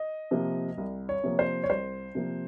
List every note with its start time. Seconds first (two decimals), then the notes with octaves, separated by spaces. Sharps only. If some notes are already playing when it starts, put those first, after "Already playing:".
Already playing: D#5
0.31 C3 F3 A#3
0.78 C2
1.09 C#5
1.24 C3 F3 A#3
1.39 C5
1.64 C#5
1.70 C2 C5
2.15 C3 F3 A#3